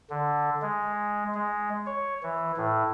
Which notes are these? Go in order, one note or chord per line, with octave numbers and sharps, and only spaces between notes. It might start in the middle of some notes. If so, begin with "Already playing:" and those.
D3
G#3
G#3
C#5
E3
A2